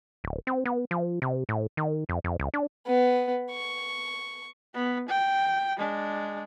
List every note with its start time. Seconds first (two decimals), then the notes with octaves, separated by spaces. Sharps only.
0.24 D1
0.47 C4
0.65 B3
0.91 F3
1.22 C3
1.49 A2
1.77 D#3
2.09 F2
2.24 F2
2.40 C#2
2.54 D4
2.87 B3
3.52 C#6
4.74 B3
5.09 G5
5.77 G#3 D4